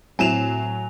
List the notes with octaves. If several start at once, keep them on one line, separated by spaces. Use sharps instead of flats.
A2 F#3 C4 E4 G#5 E7 F7